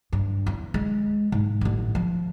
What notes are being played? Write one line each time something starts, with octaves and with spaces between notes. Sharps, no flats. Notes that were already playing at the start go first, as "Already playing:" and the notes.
G2
E2
G#3
G#2
A1 B3
F3